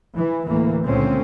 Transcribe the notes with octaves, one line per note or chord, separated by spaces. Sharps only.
E3
D2 A2 E3 A3 A#3
C#2 A#2 D3 A3 C4 C#4